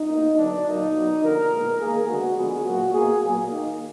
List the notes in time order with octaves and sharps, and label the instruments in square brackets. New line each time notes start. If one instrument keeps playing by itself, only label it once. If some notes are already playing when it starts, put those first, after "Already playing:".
Already playing: [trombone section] D#4
B2 A#3
D3 F#3 B3 D4
A#2 F#3 A#3 D#4
B2 F#3 B3
D3 F3 A#3 A#4
A#2 G#3 B3
D#3 A#3 G#4
D3 G#3 B3 F#4
D3 F3 G#3 B3 G#4
A#2 F#3 A#3 F#4
B2 A#3 G#4
A#2 F#3 A#3
D#3 A#3